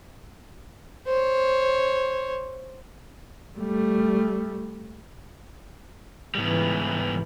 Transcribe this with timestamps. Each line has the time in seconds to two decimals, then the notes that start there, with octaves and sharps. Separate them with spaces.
1.07 C5 C#5
3.58 G3 A3
6.35 G#2 C#3 E3 G3 B3